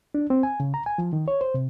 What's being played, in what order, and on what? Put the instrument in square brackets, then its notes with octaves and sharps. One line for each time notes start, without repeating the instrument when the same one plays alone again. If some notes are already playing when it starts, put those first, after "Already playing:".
[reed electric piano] D4
C4
G#5
C#3
A#5
G#5
F3
D#3
C#5
C5
C3